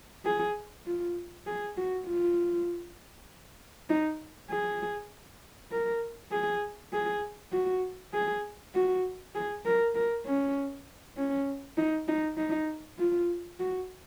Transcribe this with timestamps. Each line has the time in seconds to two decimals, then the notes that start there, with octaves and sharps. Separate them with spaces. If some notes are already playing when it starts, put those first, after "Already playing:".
0.25 G#4
0.86 F4
1.47 G#4
1.77 F#4
2.07 F4
3.90 D#4
4.50 G#4
5.72 A#4
6.32 G#4
6.93 G#4
7.52 F#4
8.14 G#4
8.74 F#4
9.35 G#4
9.65 A#4
9.95 A#4
10.26 C#4
11.17 C#4
11.77 D#4
12.08 D#4
12.37 D#4
12.99 F4
13.59 F#4